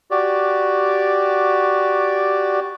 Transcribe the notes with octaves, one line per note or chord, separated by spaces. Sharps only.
F#4 G4 D5